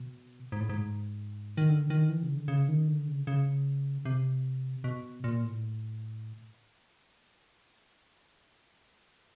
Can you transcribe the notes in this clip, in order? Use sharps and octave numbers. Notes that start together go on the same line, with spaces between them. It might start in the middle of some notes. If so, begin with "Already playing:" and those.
Already playing: B2
G#2
A2
G#2
D#3
D3
D#3
E3
C#3
D3
C#3
D#3
D3
C#3
C#3
C3
B2
A#2
A2